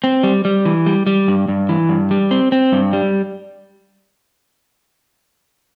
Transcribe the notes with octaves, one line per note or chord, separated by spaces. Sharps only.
C4
G3
G3
E3
G3
G3
G2
G2
E3
G2
G3
C4
C4
G2
G3